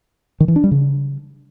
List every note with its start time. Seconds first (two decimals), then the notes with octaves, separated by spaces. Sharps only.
0.40 D#3
0.48 E3
0.56 D4
0.64 G3
0.71 C#3